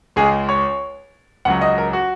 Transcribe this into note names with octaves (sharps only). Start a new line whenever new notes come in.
C#2 C#3 G#3 G#4
C#5
C#2 C#3 F#3 F#5
D#5
A#4
F#4